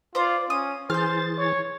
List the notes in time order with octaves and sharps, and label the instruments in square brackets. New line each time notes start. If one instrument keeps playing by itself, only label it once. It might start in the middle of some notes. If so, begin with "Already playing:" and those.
[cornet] F4 [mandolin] C5 D5
[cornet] C#4 [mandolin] D#6
[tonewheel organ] E3 G#4 A6 [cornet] C5 [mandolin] F6 G6
[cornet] C#5